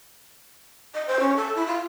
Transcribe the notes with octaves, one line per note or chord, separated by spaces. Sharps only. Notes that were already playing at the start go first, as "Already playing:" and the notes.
D#5
C5
C#4
A4
E4
F4